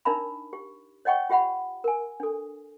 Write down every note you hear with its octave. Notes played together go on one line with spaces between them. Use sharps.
D4 D#4 A#4 E5 A#5 B5
G4
C#5 D#5 F#5 G5 C#6
F4 G4 E5 F#5 B5
A#4 G#5
D4 A4